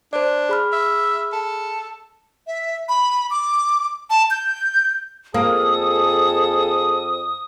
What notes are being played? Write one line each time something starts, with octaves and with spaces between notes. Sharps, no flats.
D4 C5 D5
G#4 B5 F6
E5
A4
E5
B5
D6
A5
G6
F2 A#3 G#4 A4 D#6